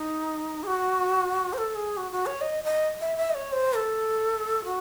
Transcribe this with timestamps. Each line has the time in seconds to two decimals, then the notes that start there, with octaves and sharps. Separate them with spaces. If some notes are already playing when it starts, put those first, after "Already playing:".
Already playing: D#4
0.63 G#4
0.67 F#4
1.53 C5
1.58 A4
1.75 G#4
1.97 F#4
2.12 F#4
2.26 C#5
2.41 D#5
2.64 D#5
3.01 E5
3.16 E5
3.30 D#5
3.35 C#5
3.52 C5
3.76 A4
4.65 F#4